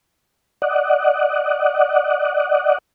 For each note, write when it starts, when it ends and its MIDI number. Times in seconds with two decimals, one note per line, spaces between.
0.62 2.78 74
0.62 2.78 75
0.62 2.78 78